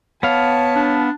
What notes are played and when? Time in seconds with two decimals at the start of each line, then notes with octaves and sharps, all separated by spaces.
0.23 B3 C#5 F5 A5
0.76 D4